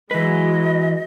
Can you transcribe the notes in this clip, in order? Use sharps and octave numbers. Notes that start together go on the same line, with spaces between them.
E3 F#3 G#3 B4 D#5